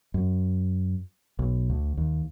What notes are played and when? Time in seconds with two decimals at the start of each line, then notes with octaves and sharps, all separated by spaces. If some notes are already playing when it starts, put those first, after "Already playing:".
0.14 F#2
1.39 B1
1.70 D2
1.97 D#2